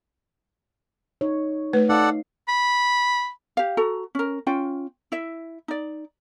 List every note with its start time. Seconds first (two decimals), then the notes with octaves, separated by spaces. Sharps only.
1.21 D#4 C#5
1.73 A3 B4
1.89 D#4 A4 D5 F5 F#5
2.48 B5
3.57 G4 F5
3.77 F#4 A4 A#5
4.15 C#4 A#4
4.47 C#4 F4 G5
5.12 E4 E5
5.68 D#4 D5